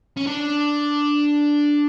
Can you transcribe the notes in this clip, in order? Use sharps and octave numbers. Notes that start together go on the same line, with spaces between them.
C#4
D4